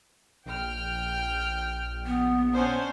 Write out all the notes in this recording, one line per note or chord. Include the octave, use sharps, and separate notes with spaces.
A#1 G5 F6
B3
C#4 D4 C5